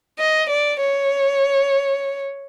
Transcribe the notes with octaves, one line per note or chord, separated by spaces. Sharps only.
D#5
D5
C#5